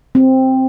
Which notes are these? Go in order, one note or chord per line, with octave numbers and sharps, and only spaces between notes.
C4